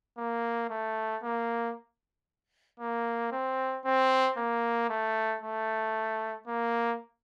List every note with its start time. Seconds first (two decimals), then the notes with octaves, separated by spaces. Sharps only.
0.18 A#3
0.70 A3
1.23 A#3
2.80 A#3
3.32 C4
3.85 C4
4.37 A#3
4.89 A3
5.42 A3
6.48 A#3